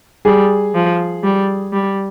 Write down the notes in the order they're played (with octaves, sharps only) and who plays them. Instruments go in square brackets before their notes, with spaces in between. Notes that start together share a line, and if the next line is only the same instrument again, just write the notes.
[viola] G3 [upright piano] G#4
[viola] F3
G3
G3